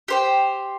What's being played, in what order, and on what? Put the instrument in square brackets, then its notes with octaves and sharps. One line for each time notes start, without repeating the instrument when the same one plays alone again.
[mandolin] G4 C5 G5